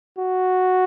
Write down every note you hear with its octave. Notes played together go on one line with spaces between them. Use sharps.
F#4